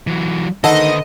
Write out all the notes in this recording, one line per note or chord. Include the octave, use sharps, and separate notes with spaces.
E3 F#3
D3 D#3 A4 B4 C5 D#5 F#5